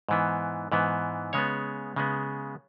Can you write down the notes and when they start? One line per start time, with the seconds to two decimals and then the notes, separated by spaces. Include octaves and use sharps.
0.09 G#2 E3 B3
0.72 G#2 E3 B3
1.33 C#3 G#3 B3 C#5
1.96 C#3 G#3 B3